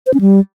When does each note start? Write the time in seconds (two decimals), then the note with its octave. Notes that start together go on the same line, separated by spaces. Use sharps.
0.07 C5
0.14 C#4
0.21 G3